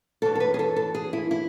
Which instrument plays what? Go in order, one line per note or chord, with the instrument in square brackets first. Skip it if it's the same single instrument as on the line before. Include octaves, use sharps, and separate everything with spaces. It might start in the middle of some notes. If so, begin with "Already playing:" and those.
[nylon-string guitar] F#2 E3 A4
A4
B4
G#4
A4
A4
G#4
E4
E4